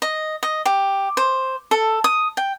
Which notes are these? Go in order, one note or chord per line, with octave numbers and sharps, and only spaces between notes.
D#5
D#5
G4
C5
A4
D#6
G5